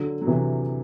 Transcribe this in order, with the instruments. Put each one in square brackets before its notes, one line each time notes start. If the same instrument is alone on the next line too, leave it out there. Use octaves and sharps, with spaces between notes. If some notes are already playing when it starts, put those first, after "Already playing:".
Already playing: [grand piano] D3 F#3
F#3
C3 E3